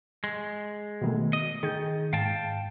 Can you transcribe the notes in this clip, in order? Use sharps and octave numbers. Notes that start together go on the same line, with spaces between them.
G#3
B2 D#3 A3
D#5
D#3 G#4 G6
G#2 F5 G5 A5